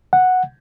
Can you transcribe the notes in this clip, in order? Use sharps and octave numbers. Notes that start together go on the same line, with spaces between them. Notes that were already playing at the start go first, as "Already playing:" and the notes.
F#5